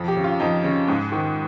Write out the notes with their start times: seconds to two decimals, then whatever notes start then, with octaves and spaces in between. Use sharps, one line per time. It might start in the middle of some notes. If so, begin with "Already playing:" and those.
Already playing: F2
0.08 G4
0.16 C#3
0.24 F4
0.40 F2 D#4
0.64 C#3
0.88 G#2
1.12 D#3